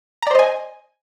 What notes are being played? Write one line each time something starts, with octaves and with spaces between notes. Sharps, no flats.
C5 D5 D#5 G#5 A#5